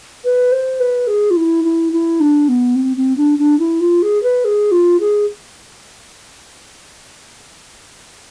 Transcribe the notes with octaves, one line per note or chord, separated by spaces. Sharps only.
B4
C5
B4
G#4
F4
E4
E4
E4
D4
B3
C4
C4
D4
D4
E4
F4
G#4
B4
G#4
F4
G#4